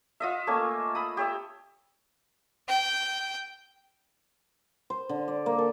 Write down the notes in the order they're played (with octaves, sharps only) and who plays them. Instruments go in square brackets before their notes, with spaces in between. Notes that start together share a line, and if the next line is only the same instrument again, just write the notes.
[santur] F4 D#5 E5
A3 A#3 C#4 G#5
B5 D#6
G4 C#5 E5
[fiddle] G5
[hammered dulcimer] C5
D3
D5
A#3
A4